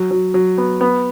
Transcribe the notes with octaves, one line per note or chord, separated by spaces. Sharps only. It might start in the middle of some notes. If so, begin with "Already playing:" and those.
Already playing: F#3
F#3
F#3
B3
B3